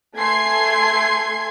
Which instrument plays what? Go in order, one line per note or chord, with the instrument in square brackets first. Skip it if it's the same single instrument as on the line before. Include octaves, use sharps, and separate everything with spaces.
[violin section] A3 G#5 C6 G#6 C7